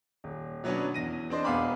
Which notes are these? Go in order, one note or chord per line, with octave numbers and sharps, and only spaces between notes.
D#1
B2 F#3 B3 C#4 D4
E2 A#6 D#7
C4 D4 C5 D#5
E1 B3 F5 G#5 B5 D6